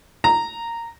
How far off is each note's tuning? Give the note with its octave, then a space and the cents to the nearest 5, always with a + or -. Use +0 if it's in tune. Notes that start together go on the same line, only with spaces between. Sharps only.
A#5 -10